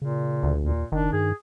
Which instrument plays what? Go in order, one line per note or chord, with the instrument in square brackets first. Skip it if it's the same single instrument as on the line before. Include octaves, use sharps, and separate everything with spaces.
[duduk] A#2 [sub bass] C#3
[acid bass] D2
[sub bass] D#2 [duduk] A#2
[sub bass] F#1 [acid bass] D#3 [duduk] D4
[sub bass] G2 [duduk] G#4